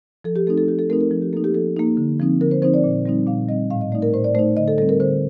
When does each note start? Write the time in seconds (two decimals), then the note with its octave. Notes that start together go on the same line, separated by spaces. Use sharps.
0.24 F3 A4
0.36 G4
0.47 A3 C4 D#4 A4
0.58 A4
0.68 F3 G4
0.79 A4
0.90 A3 C4 D#4 A#4
1.01 A#4
1.11 F3 A4
1.22 G4
1.33 A#3 D#4 A4
1.44 G4
1.54 F3 A4
1.76 A#3 D#4
1.97 D3
2.19 F3 C4 D#4
2.41 D3 A#4
2.51 C5
2.62 F3 C4 D#4 C5
2.74 D5
2.84 A#2
3.06 G3 C4 D#4
3.27 A#2 F5
3.49 G3 C4 D#4 D#5
3.71 A2 F5
3.81 D#5
3.92 A3 D#4 D5
4.02 A#4
4.14 A2 C5
4.24 D5
4.35 A3 D#4 C5
4.57 D3 D#5
4.68 A4
4.78 G3 C4 A4
4.89 A#4
5.00 D3 C5